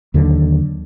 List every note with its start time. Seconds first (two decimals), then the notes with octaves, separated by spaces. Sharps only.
0.14 D#2 D3 D#3 F#3